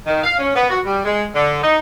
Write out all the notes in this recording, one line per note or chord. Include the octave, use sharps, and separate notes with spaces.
D#3
F5
C#4
B3
F#4
G3
G#3
D3
D#4